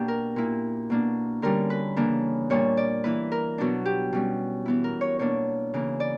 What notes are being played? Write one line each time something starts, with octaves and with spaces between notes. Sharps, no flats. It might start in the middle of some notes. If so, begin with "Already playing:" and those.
Already playing: B2 A#3 D4 G4
A#4
A#2 A#3 E4
B2 A#3 D4
D3 G3 C#4 A#4
B4
C#3 E3 A#3 D4
A#2 G3 A#3 D4 C#5
D5
E3 A#3 E4 B4
A#4
B2 F#3 B3 D4
G4
B2 G3 C#4
E3 B3 E4
A#4
C#5
B2 A#3 D4 C#5
C#3 E3 A#3
D5